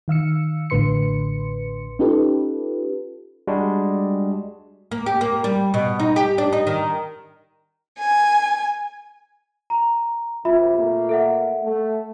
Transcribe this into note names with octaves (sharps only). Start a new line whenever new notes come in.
D#3 F5 E6 C#7
A1 A2 D3 B4 C6 C#7
C#4 D#4 F4 G4 A4 B4
G3 G#3 D4 F#4
A#3
G4
A#3
G3
B2
D#4
G4
D4
D#4
D#3
G#5
A#5
F#2 C3 F4 E5 B5
A#2 A3 A#3
A4 E5 F#5
A3